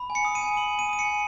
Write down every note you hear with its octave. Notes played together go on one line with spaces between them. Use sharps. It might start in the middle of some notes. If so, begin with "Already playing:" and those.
Already playing: B5
G#5
C#7
D#6
D#7
G#5
B5 F#7
G#5
D#7
D#6 D#7
C#7
G#5